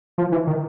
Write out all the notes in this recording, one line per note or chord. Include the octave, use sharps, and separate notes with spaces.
F3
E3
D#3